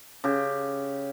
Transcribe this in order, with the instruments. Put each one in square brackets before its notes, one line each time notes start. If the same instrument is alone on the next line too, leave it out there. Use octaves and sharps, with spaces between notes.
[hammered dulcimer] C#3 G4